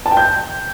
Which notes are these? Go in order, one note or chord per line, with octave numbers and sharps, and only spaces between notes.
A5
G5
G6